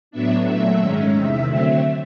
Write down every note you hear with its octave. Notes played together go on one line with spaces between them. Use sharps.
A2 F#3 B3 D4 E5
A#2 F#3 A3 E5
G#2 D#3 G#3 C#4
E2 C3 D#3 E5
D3 F#3 A3 C4